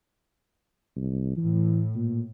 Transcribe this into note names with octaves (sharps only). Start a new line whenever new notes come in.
C2
A2 E3
A#2